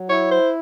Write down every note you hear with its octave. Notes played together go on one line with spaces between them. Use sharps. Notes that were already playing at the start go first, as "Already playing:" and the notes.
Already playing: F#3
E4 C#5
C5